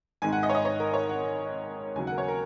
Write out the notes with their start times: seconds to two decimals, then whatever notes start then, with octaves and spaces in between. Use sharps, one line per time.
0.22 G#1 G#2 D#3 G#3 G#5
0.33 F#5
0.43 D#5
0.49 C#5
0.55 D#5
0.65 C#5
0.80 A#4
0.94 C#5
1.09 F#5
1.95 D#2 C#3 F#3 G#5
2.07 A#4 F#5
2.18 C#5
2.28 A#4